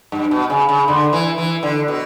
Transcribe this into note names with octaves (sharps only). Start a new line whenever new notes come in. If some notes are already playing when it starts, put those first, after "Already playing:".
G2
B2
C#3
C#3
D3
E3
E3
D3
B2